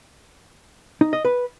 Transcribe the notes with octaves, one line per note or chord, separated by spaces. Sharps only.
D#4
D#5
B4